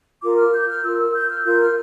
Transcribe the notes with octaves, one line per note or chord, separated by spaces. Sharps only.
F4 A#4 D6
F6
G6
F6
F4 A#4 E6
E6
G6
F6
F4 A#4 G6
F6